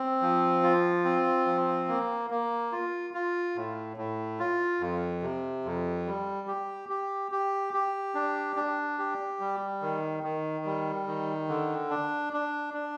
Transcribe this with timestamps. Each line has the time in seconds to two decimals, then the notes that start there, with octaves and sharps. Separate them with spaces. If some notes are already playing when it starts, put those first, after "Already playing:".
Already playing: C4
0.21 F3
0.63 F4
1.05 C4
1.46 F3
1.88 A#3
2.30 A#3
2.72 F4
3.14 F4
3.56 A2
3.97 A2
4.39 F4
4.80 F2
5.22 C3
5.65 F2
6.07 G3
6.48 G4
6.89 G4
7.32 G4
7.74 G4
8.15 D4
8.56 D4
8.98 G4
9.40 G3
9.82 D#3
10.23 D#3
10.65 G3
11.07 D#3
11.48 D3
11.90 D4
12.33 D4
12.74 D4